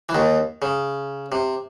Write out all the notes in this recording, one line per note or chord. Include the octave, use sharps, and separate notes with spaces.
E3
D#2 D#3
C#3
C3